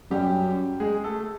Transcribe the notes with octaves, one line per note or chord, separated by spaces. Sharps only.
F#2 G3 G4
G#3 G#4
A3 A4